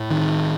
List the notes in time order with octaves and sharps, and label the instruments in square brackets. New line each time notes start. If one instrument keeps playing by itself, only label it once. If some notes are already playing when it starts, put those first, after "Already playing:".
Already playing: [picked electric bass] A2
D#3